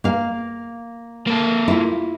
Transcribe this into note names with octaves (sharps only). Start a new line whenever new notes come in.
A#3 F5
A#3 A4
E4 F4